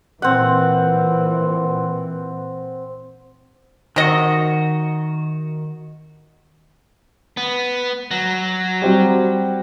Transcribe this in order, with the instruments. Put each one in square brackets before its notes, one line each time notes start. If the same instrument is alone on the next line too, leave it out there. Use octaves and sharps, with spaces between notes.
[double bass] A#2 E3 [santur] C4 F#5
[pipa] C3 D#5 [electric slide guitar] D#3 F#4
[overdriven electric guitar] B3
F#3
[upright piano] G3 C4 F#4